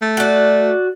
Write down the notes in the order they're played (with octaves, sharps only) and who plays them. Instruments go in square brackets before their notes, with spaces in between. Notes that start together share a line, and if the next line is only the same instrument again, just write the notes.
[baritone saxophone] A3
[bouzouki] F#4 D5